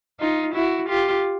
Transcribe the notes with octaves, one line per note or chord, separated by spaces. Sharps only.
D#4 F4
E4 F#4
F4 G4